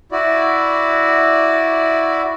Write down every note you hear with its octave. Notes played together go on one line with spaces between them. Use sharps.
E4 F#4 D5